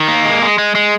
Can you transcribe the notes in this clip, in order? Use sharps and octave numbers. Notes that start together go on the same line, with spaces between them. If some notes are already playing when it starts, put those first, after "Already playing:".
Already playing: D#3
A#3
G#3
G#3
G#3
G#3